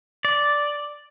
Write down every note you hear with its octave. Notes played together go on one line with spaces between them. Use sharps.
D5